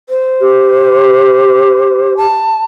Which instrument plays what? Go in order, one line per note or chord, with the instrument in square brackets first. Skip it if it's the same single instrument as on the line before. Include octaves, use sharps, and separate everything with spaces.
[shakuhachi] C5
[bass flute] G4
[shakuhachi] A5